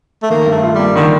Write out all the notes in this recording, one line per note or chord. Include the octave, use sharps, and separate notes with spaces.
A3
D#3 A#3
G2
A3
F4
G3 A#3
D3 D#3